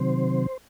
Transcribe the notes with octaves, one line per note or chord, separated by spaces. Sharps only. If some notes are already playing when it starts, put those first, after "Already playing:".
Already playing: C3 D#3 F#3 C4 C5